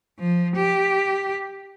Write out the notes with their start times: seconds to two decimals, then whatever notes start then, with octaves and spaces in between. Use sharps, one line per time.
0.19 F3
0.56 G4